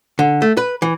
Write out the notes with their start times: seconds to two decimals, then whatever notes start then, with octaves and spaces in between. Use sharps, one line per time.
0.19 D3
0.42 A3
0.57 B4
0.82 E3